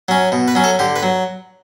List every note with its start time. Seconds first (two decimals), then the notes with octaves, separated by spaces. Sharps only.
0.08 F#3 C#4
0.32 B2
0.48 B4
0.55 F#3 C#4
0.64 A4
0.79 D3 G4
0.96 B4
1.03 F#3